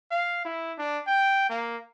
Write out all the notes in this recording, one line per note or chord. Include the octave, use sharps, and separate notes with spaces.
F5
E4
D4
G5
A#3